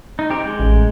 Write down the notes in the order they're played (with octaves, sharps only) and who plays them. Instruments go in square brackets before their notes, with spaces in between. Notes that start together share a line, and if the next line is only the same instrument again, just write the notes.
[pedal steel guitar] D#4
C4 G4 A#4
G#3
[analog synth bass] A1